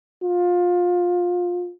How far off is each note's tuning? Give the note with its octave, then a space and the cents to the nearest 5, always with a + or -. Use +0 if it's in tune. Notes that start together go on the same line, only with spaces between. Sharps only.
F4 +20